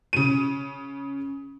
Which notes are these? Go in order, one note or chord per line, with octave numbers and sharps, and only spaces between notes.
C#3 D#7